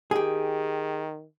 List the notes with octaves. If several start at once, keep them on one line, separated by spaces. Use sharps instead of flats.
D#3 G4 G#4